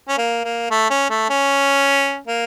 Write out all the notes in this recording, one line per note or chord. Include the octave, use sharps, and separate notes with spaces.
C#4
A#3
A#3
A3
C#4
A3
C#4
A#3